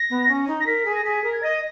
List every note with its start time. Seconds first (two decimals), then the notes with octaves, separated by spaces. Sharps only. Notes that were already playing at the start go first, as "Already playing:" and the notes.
Already playing: A#6
0.10 B3
0.28 C#4
0.48 D#4
0.61 A#6
0.66 A#4 B6
0.85 G#4
0.95 A#6
1.05 G#4 B6
1.24 A#4
1.33 G#6
1.43 D#5 A#6